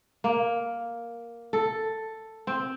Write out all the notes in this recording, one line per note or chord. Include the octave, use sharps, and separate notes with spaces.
A#3
A4
C4